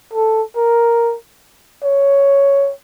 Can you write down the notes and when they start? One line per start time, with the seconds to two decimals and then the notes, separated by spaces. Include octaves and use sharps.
0.14 A4
0.57 A#4
1.84 C#5